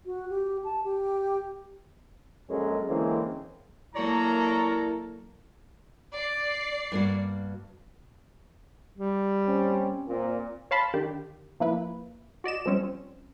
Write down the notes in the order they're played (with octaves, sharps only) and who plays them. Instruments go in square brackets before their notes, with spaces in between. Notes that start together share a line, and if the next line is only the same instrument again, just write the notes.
[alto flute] F#4
G4
A5
G4
[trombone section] A#1 F#2 G#3 C#4 A4 A#4
D3 E3 G#3 A#3 C4 C#4
[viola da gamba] F#3 A#3 A4 [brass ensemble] E4 A#4 [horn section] C#5 D5 A#5
[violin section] D5 C7
[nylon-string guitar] G2 A#3 F#4
[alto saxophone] G3
[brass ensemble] A#2 C4 C#4
[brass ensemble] A#2 [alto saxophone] C4
[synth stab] C#5 F5 A5 B5 C6
D3 D#3 G4
F3 A#3 E4 B4
F#4 D5 D#5 E7
F3 G3 C4 C#4